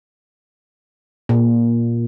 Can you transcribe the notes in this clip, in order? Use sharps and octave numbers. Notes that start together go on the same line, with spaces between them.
A#2